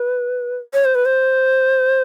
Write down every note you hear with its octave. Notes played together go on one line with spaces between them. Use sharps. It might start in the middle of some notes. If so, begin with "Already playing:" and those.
Already playing: B4
C#5
C5
B4
C5